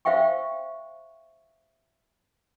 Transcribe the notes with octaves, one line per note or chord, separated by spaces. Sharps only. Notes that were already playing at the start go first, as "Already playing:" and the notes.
C5 E5 F5 G5 C#6